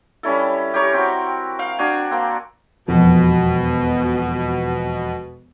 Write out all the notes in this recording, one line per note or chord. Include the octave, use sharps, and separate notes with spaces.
G3 C#4 E4 A4
G4 A#4 C#5
C4 F#4
F5 G5
D4 F#4 G#5
A#3 C4
E1 F2 B2